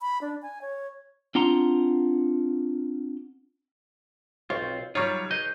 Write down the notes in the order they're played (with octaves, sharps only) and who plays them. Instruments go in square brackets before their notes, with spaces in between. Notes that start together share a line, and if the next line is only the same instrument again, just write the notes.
[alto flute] B5
D4
G#5
C#5
[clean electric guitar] C4 D4 F4 F#5 A#5 C6
[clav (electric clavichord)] B1 [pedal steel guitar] C4 F4 [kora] C#5
[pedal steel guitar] F#3 [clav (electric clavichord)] G3 F4 [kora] D#4 D5 [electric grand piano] C#5 C#6
[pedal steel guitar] G#4 B4 G6 [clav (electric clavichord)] D#5